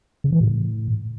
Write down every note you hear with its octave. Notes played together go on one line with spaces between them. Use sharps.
C#3
E3
A2